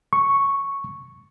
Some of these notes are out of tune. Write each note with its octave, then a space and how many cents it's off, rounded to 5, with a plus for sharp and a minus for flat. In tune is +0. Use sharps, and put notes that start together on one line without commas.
C#6 +0